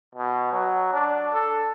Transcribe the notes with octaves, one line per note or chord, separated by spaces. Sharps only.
B2
F#3
D4
A4